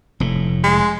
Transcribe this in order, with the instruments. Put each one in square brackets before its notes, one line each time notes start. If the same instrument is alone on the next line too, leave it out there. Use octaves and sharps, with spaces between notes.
[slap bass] F1 A2
[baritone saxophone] G#3